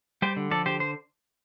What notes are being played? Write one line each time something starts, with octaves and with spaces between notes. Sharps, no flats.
G3 G4 C5
D3
F3 A4 D5
D3 G4 C5
C5